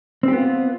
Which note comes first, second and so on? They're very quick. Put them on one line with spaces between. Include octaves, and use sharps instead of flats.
C4 G4 B3 F4